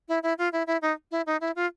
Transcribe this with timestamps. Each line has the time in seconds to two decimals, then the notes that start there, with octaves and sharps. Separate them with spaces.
0.08 E4
0.23 E4
0.38 F4
0.52 E4
0.67 E4
0.82 D#4
1.11 E4
1.26 D#4
1.41 E4
1.56 F4